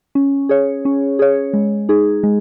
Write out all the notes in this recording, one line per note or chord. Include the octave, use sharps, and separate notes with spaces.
C#4
G#4 C#5
C#4
G#4 C#5
G#3
D#4 G#4
G#3